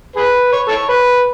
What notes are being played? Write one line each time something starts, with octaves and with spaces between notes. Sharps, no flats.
G#4 B4
C#5
A4 C#5
B4